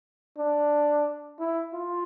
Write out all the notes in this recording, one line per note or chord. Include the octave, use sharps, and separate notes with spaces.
D4
E4
F4